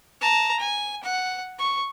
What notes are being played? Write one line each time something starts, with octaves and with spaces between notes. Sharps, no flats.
A5 A#5
G#5
F#5
C#6